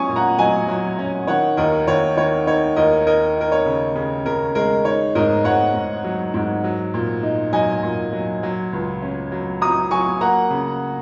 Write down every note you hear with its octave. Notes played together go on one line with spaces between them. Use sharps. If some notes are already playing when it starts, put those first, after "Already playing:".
Already playing: F#3 C#4 G#5 C#6 D#6
A#2
F#5 A#5
F#3 D#5 G#5
F#3
C#4
D#3 C#5 F#5
D#2 A#4 D#5
D#2 C#5
D#3 C#5
D#4 C#5
D#2 A#4 D#5
D#4 A#4 D#5
D#4 A#4
C#5
C#3
C#3
C#3 A#4
G#3 A#4
D#4 C#5
G#2 A#4 D#5
G#2 C#5 F#5
G#2
F#3
G#2
F#3
A#2
D#4
F#3 D#5 G#5
A#2
F#3
F#3
C#2
C#4
F#3
F#3 A#5 D#6
F#3 G#5 C#6
A#3 F#5 A#5
C#3